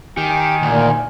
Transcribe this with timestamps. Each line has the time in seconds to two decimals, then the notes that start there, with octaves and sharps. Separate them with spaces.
0.17 D#3 G4 G#5
0.62 D2 A#2